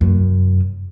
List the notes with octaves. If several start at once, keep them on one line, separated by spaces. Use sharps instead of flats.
F1 F#2